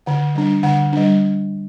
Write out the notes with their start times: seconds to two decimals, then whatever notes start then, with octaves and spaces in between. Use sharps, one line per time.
0.06 D3 F#5
0.35 G3 D4
0.63 D3 F#5
0.93 G3 D4